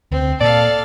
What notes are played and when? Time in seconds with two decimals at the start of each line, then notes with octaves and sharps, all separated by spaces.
0.11 D2 C4
0.41 A#2 A4 D5 F5